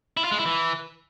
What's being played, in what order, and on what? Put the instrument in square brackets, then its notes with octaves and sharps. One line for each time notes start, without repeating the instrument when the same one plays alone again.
[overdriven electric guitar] E4
F4
G#3
E4
E3